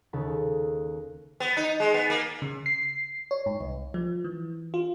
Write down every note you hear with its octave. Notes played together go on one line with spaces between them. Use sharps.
D#2 C#3 A4
B3
D#4
G#3
B3
A#3
C#3
C7
C#5
G#2
C2
F3
E3
F4